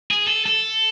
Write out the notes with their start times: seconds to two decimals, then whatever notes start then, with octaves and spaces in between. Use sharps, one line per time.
0.11 G#4
0.27 A4
0.46 A4